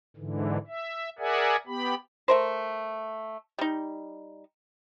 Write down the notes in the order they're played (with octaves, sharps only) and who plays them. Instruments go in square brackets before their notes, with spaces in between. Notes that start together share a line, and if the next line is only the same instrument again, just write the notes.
[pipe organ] G#2 D3 E3
E5
G#4 A#4 D5 E5 F#5 G#5
B3 G4 B5
[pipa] A3 A#4 C5
G3 D#4